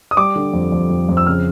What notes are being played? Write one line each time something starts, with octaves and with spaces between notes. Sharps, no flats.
D#6
G3 D6
D3
F2
F2
F2
F2
E6
C#3 F6